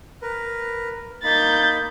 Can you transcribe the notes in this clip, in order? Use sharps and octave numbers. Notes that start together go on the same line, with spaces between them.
A#4 B4
A#3 D#4 B5 G6 A6